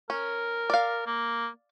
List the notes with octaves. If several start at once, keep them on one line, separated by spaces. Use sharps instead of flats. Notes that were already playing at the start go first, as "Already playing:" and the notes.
C#4 A#4
D5 F5
A#3